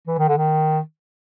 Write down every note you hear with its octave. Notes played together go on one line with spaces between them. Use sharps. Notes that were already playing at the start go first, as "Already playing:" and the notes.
E3
D#3
D3
D#3